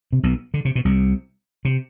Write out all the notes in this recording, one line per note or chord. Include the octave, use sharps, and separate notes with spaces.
C3
B1 B2
D3
C3
B2
C2 C3
C3